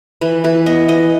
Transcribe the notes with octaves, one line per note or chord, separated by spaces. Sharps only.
E3 B4
E3 B4
B3 D#5
E3 D#5